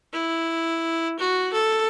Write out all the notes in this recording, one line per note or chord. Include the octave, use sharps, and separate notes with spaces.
E4
F#4
A4